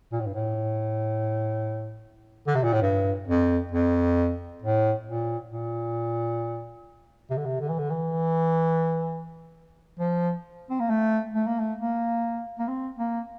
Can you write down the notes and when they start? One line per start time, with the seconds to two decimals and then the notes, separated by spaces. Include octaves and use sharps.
0.12 A#2
0.20 A2
0.26 G2
0.34 A2
2.47 D3
2.55 C3
2.63 A#2
2.73 A2
2.82 G2
3.27 F2
3.72 F2
4.62 A2
5.06 A#2
5.51 A#2
7.30 C3
7.37 D3
7.45 C3
7.60 D3
7.69 E3
7.79 D3
7.90 E3
9.99 F3
10.70 C4
10.80 A#3
10.89 A3
11.34 A3
11.47 A#3
11.59 A3
11.78 A#3
12.59 A#3
12.68 C4
12.99 A#3